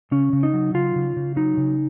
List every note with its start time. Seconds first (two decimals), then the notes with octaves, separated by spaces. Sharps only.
0.11 C#3 C#4
0.33 C#3
0.43 D#4
0.54 F#3
0.74 C#3 F4
0.96 C#3
1.16 C#3
1.36 F#3 D#4
1.57 C#3